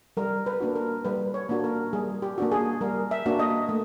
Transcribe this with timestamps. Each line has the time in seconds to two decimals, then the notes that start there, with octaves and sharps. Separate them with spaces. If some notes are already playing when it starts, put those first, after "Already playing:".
0.17 G3 A#4
0.46 B4
0.61 A#3 D4 F#4
0.76 A#4
1.05 G3 B4
1.34 C#5
1.49 A#3 D4 F#4
1.64 A#4
1.93 G3 G#4
2.22 G4
2.38 A#3 D4 F#4
2.52 G#4
2.81 G3 A#4
3.11 E5
3.26 A#3 D4 F#4
3.39 D#5
3.69 A3